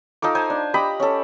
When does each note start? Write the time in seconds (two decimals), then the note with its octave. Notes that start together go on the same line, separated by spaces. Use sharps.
0.22 D#4 F4 A4 D6
0.35 D#4 C5 G#5
0.50 D4
0.74 G4 D#5 A#5 B5
1.00 C#4 A4